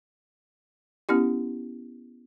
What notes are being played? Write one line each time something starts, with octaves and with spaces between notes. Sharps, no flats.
B3 C#4 E4 G4